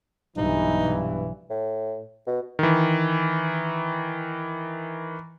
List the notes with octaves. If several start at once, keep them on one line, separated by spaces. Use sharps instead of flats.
B1 G2 E3 D#4
A2
B2
D#3 E3